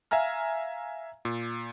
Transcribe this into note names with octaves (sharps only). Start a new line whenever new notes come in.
E5 F5 G#5 A#5 F6
A#2